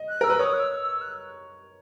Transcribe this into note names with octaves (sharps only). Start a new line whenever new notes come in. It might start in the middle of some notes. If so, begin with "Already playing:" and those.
Already playing: D#5
F#6
A#4 E6
B4
C#5 D#6
F#6
E6
E6
F#6